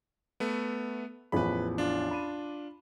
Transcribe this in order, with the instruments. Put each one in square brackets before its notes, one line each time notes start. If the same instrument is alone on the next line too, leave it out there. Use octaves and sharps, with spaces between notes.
[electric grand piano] A3 B3
[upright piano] A1 E2 F3 [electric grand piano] B4 B5
[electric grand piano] D4 F4
[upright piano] B5 D#7